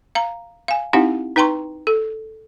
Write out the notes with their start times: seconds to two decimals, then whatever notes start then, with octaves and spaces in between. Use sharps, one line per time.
0.15 F5 A#5
0.68 F5 G#5
0.93 C4 D#4 E4 G4 F5 F#5
1.36 D#4 B4 G5 A#5 C6 C#6
1.87 A4